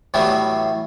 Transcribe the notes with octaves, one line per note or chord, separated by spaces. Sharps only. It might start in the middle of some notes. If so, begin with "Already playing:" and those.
A2 E3 F#3 G3 B3